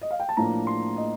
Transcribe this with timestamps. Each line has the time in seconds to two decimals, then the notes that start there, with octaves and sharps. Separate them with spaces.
0.01 D#5
0.11 F5
0.20 G5
0.29 A5
0.37 A2 F3 A#3 D4 A#5
0.67 C6
0.96 D#5